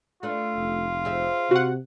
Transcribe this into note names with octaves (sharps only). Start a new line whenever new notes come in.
A3 D4 F4 B4
F1
C4 G#4 E5
C3 F#4 F#5